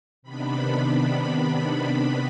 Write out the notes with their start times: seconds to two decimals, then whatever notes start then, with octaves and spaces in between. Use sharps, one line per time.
0.22 C3 D#3 B3 D4 B5